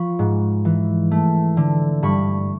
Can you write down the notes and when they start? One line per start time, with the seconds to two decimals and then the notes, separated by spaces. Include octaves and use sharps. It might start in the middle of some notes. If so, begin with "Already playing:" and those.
Already playing: F3 B5 C#6
0.19 G#2
0.65 E3
1.11 A3
1.57 D3
2.03 G2 B5 C#6